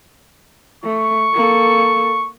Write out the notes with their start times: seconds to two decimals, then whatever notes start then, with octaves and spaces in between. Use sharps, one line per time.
0.84 A3 C#6
1.34 A#3 A4